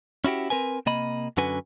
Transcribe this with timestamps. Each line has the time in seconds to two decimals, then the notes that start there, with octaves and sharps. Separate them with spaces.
0.24 C#4 E4 F#4 G4
0.50 C4 A#4 B4 G#5
0.86 C3 A#3 D#5 B5
1.37 F#2 D3 C#4 F#4 B4 G#5